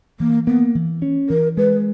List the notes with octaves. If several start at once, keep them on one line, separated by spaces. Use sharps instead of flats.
E3 A#3
A#3 B3
E3
C#4
E3 A#4
G#3 B4